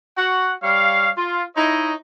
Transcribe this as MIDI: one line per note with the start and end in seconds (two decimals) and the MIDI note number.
0.17 0.52 66
0.17 0.52 78
0.62 1.09 55
0.62 1.09 73
0.62 1.09 77
1.17 1.42 65
1.56 1.93 63
1.56 1.93 64
1.56 1.93 73
1.56 1.93 75